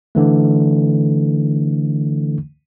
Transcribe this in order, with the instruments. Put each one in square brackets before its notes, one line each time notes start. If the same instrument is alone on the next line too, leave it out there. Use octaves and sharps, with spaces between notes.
[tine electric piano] D3 E3 A3